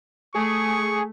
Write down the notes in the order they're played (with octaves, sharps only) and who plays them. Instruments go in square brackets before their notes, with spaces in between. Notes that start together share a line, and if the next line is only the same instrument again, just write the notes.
[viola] A3 [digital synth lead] G#4 [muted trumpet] C#6